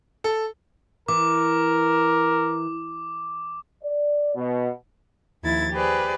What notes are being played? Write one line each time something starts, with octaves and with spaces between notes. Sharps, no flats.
A4
E3 A#4 D6
D5
B2
D#2 F3 E4 G#6 A6
G4 G#4 B4 C5 D5